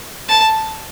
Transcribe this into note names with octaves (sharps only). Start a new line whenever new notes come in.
A5